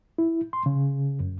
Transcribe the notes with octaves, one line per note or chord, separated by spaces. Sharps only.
E4
C6
C#3
F#2